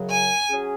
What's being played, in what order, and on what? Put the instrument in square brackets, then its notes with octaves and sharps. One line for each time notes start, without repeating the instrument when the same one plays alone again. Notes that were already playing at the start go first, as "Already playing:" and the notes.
Already playing: [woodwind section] F#2 C#3 F#3
[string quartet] G#5
[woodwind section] F#3 C#4 G#4